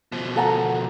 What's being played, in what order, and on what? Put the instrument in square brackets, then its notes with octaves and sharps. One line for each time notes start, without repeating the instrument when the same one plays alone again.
[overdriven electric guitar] B2 F3
[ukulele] A4 F#5 A#5